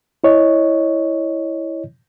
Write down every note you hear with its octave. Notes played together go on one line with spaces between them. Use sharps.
E4 C#5 D#5